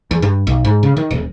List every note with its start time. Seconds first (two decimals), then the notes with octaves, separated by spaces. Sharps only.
0.11 E2
0.22 G2
0.47 B1
0.65 G#2
0.83 C#3
0.97 D#3
1.11 D#1